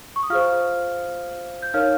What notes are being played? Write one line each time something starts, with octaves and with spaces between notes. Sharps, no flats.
C#6
D#6
F4 G#4 C5 F5 F6
G6
D#4 A#4 C#5 F5 F6